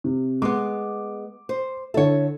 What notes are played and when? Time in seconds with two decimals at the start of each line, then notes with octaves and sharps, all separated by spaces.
0.04 C3
0.42 G#3 B3 D6
1.49 C5
1.94 D3 E4 A4 C#5